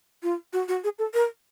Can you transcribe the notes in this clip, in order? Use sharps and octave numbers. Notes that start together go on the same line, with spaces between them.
F4
F#4
F#4
G#4
A4
A#4